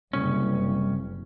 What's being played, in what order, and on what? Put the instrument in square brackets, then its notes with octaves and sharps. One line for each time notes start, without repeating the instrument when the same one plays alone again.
[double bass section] F#1 [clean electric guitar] C2 C#4